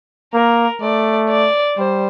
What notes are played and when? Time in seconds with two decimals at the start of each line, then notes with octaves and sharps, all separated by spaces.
0.34 A#3 A#4
0.81 A3 D5
1.30 D5
1.77 G3 C5